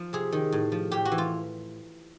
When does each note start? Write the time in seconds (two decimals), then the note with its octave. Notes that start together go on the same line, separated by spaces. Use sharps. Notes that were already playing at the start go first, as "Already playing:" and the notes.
Already playing: F3
0.13 C3 G#4
0.32 D#3
0.52 A2
0.72 F3
0.91 A2 G4
1.05 F#4
1.12 E3
1.18 F4